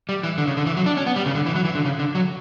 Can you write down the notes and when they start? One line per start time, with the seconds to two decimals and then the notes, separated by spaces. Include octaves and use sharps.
0.09 G3
0.23 E3
0.38 D3
0.47 C#3
0.57 D3
0.66 E3
0.77 F#3
0.86 D4
0.97 C#4
1.06 B3
1.16 G3
1.26 C#3
1.35 D3
1.46 E3
1.55 F#3
1.65 E3
1.75 D3
1.85 C#3
1.99 D3
2.15 F#3